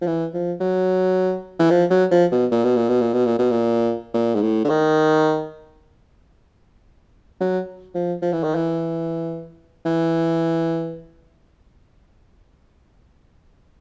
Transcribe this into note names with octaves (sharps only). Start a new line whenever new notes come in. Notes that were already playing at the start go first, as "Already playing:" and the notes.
F3
E3
F3
F#3
E3
F3
F#3
F3
B2
A#2
B2
A#2
B2
A#2
B2
A#2
B2
A#2
A#2
G#2
A2
D3
D#3
F#3
F3
F3
E3
D#3
E3
E3